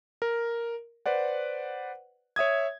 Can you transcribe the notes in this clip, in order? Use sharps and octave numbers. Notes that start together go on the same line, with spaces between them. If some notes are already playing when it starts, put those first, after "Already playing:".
A#4
B4 C5 D5 F#5
C#5 E5 D#6 G#6